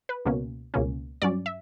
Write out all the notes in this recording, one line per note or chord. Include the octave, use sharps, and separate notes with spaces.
B4
C#2 B2 A#3 C#4
C#2 B2 A#3 C#4
G2 F#3 C#4 D5
E5